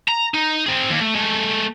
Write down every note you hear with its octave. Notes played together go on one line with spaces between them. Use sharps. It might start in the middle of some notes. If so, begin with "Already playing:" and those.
A#5
D#4
C4 G#4
D#2
A3
G#3 A3